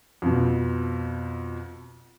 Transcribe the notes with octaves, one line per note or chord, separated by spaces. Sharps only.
F2 B2